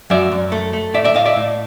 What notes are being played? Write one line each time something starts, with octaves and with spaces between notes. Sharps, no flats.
F#2 D5 E5
F#2
A3
A3
A2 D5 E5
D5 E5
A2 D#5 F5
D5 E5
A2